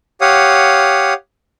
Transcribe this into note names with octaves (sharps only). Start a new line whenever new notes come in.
G4 C#5 F5 F#5 D#6